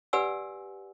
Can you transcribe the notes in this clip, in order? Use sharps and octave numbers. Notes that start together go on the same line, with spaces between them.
G4 B4 D5 F#5 G#5 E6